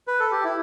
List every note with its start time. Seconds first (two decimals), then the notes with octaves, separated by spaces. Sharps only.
0.08 B4
0.20 A4
0.32 G4
0.44 E4